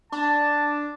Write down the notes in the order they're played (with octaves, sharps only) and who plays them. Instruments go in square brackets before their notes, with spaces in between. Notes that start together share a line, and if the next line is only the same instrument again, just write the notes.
[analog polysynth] D4 [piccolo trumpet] A5